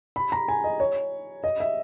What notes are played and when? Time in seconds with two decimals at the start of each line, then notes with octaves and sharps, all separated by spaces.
0.16 B5
0.32 A#5
0.48 G#5
0.64 D#5
0.80 C#5
1.44 D#5
1.60 E5